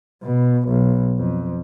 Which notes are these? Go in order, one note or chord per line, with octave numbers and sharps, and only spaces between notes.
B2
B1
F2